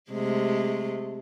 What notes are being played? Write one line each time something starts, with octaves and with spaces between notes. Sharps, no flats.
C3 G#3 A3